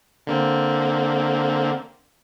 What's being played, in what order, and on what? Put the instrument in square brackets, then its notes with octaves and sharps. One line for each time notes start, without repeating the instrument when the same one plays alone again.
[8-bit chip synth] D3 A#3 C4